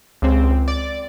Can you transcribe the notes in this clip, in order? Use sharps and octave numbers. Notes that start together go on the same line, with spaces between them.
C#2 C4
D5